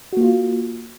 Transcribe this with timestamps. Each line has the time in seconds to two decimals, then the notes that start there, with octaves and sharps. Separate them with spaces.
0.13 F#4
0.17 A#3
0.21 F4